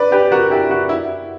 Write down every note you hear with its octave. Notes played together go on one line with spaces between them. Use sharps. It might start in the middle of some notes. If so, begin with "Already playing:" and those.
Already playing: B4 D5
G4 B4
F#4 A#4
E4 G4
F#4
E4